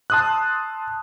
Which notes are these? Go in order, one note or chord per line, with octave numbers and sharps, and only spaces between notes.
A5 C6 D#6 E6 F#6